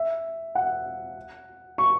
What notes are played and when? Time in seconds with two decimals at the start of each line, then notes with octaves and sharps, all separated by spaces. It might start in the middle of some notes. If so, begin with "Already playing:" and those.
Already playing: E5
0.55 F#5
1.78 C#6